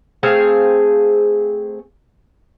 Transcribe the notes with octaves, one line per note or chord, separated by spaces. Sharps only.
A3 C4 G#4 F5